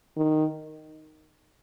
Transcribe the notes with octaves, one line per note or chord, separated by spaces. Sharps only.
D#3